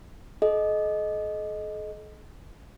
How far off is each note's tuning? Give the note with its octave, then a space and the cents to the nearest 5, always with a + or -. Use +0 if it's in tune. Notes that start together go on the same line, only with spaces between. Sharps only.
A4 -45 D#5 +0